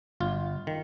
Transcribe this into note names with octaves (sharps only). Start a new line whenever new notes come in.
G1 F4
D#3